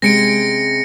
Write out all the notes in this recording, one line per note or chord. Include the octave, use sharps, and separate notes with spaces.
C3 G#3 C#4 A#6 C#7 D7